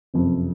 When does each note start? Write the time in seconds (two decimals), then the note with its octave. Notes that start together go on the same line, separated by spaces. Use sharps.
0.14 F#1 F2 C3